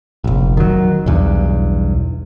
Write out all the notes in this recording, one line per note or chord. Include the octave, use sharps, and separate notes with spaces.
F1 A#1
D#3 F#3
B1 E2 G2